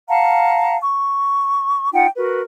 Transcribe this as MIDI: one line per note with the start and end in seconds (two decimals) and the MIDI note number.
0.08 0.77 77
0.08 0.77 78
0.08 0.77 81
0.08 0.77 82
0.82 1.90 85
1.93 2.07 63
1.93 2.07 65
1.93 2.07 78
1.93 2.07 79
2.16 2.41 66
2.16 2.41 70
2.16 2.41 71